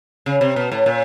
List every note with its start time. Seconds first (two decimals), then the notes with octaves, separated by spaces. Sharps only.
0.26 C#3
0.41 C3
0.56 B2
0.72 A2
0.86 A#2